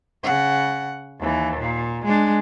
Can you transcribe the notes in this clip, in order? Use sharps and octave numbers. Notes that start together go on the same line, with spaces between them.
C#3 F#5
D#2 E3
A#2
G#3 D4